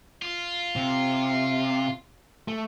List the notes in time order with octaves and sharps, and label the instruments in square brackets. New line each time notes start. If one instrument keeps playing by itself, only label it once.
[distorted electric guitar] F4
[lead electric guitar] C3
A3